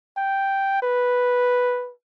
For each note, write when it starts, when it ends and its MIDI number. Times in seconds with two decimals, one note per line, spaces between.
0.17 0.80 79
0.82 1.92 71